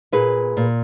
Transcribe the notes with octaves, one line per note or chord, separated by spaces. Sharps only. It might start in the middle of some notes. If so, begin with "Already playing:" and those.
A#2 G#4 B4
A#2